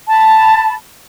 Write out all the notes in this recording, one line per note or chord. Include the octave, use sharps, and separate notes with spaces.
A5 B5